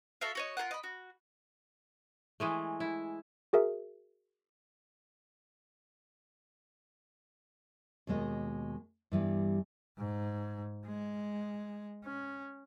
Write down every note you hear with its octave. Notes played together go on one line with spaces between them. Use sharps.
F#4 A4 E5 F5
F#4 C#5 D#5
F4 G#4 A#4 F#5
D#5 B5
F#4
E3 G#3 A3
E4
F#4 G#4 A#4 E5
D#2 B2 G#3 D#5
G2 E3 G3 B3
G#2
G#3
C#4